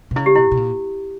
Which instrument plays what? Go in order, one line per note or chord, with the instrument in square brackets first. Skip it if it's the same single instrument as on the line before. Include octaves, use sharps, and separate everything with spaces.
[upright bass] B2
[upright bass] C#3 [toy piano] E4
[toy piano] G4
[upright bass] B2 [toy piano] E4
[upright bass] B2
A#2